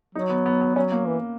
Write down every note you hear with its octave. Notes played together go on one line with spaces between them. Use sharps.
F#3 D#4
B3
B3
B3
F#3 C#4
A#3
E3